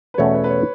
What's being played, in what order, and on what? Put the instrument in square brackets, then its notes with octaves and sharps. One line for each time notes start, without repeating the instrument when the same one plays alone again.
[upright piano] B4
[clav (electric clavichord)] E2 B2 A3 C#4 [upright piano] C#5
[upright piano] B4
B4
C#5